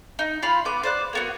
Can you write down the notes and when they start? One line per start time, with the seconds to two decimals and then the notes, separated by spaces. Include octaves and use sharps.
0.19 D#4
0.42 F4 F5 B5 C6
0.65 B3 D6
0.83 C5 D5 F#6
1.13 A#3 B3 F#4